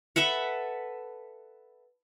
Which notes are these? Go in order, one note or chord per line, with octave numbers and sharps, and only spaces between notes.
A4 B4 E5 F#5